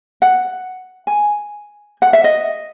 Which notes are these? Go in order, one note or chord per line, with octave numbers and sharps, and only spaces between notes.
F#5
G#5
F#5
E5
D#5